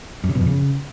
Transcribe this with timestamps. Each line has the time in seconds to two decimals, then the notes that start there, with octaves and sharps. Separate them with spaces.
0.24 F#2
0.29 C#3
0.35 B2
0.41 F2
0.46 C#3